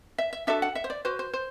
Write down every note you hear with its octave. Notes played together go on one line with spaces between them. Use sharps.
E5
E5
D4 F#4 A4 E5
F#5
E5
C5
D5
F#4 B4 C5
C5
C5